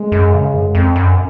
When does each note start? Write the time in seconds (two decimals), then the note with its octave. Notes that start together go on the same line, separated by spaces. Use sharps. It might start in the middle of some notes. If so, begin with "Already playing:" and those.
Already playing: G#3
0.12 F#2
0.34 C#3
0.54 F#2
0.75 F2
0.96 F#2